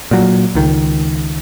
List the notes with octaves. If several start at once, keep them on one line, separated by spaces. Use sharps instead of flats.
A#2 F#3
C#2 D#3